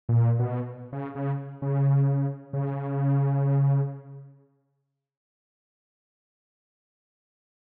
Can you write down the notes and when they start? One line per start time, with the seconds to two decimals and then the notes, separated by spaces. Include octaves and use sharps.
0.09 A#2
0.39 B2
0.92 C#3
1.15 C#3
1.62 C#3
2.53 C#3